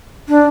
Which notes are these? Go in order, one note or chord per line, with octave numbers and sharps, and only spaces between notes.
D4